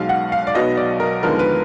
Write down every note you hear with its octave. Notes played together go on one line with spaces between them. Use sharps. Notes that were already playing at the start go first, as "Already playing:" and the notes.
Already playing: B1 B2 G#3 F5
F#5
F5
D5
B1 B2 F#3 B3 D#5
D5
A#4
D#2 D3 F3 G#3 B3 A#4
B4